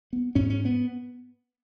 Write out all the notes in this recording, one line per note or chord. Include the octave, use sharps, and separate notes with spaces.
B3
G#2 C#4
C#4
B3